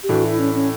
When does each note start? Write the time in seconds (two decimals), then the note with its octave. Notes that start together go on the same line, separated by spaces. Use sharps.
0.03 G4
0.09 A2 E3 A3 D4 F#4
0.24 E4
0.39 C#4
0.55 C#4